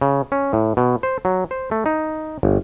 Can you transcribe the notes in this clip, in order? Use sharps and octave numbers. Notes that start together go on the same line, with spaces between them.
C#3
C#4
A2
B2
C5
F#3
C5
A3
D#4
G1